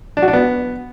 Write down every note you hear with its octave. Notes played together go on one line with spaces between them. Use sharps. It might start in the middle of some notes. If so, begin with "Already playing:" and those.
D4
F#4
D4
B3